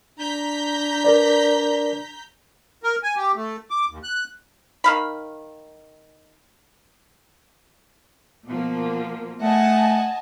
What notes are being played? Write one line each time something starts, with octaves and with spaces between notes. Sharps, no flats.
D4 A#5 G6 B6
A#4 B4 D5
A#4
G#5
G4
A3
D6
D#2
F#6
D#3 F5 B5
B2 F3 A#3
A3 D#5 F#5 G#5 A5